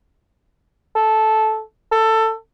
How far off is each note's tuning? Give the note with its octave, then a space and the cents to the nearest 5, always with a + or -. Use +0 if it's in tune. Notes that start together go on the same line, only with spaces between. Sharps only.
A4 -10
A4 +15